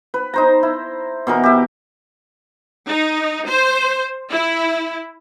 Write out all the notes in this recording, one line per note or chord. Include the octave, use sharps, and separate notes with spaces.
B4
D#4 C5 A#5
E4
B2 E3 A#4
G4 E5
D#4
C5
E4